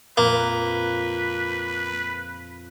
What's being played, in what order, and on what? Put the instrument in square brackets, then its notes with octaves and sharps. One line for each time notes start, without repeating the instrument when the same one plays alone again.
[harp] F2 A#2 [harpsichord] A#3 [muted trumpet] B4